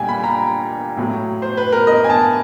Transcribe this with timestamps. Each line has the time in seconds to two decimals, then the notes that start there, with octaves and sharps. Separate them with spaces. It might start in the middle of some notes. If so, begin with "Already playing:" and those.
Already playing: A#2 G3 G5 G#5
0.08 B5
0.24 A#5
0.97 A2 F#3
1.42 C5
1.57 B4
1.72 A#4
1.87 D#5
2.04 G#5
2.10 A5